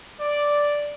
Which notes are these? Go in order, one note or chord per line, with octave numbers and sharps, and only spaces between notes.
D5